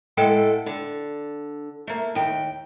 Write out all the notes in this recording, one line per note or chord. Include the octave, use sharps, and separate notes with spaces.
A2 G#3 A4 F#5 G5
D3
A3 A#3
D#2 G5